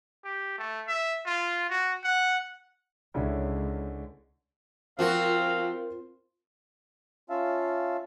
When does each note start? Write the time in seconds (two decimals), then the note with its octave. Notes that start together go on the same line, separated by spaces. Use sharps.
0.24 G4
0.58 A3
0.88 E5
1.26 F4
1.69 F#4
2.04 F#5
3.14 C#2 D3 C#4 E4
4.99 F3 C4 F4 F#4 A#4 F5
7.30 C#4 F4 E5 F5 A5